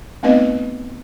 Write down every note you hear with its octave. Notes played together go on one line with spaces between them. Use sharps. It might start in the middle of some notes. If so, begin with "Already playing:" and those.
A3 B3 C4 D#4 B4 D#5